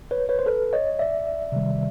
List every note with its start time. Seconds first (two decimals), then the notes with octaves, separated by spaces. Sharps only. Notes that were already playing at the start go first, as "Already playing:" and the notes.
0.11 B4 C#5
0.29 B4 C#5
0.39 C5
0.46 A4 B4
0.73 C#5 D#5
0.99 D5 E5
1.52 C3 D#3 G3